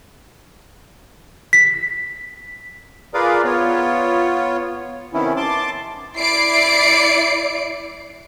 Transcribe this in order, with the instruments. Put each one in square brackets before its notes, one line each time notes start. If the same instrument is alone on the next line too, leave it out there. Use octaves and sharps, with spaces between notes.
[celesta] B6
[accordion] F4 G#4 A#4 B4 D5 F5
B3 F4 C#5
C3 D#3 B3 C#4 E4
A5 C6 D6
[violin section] E4 D5 C7 D7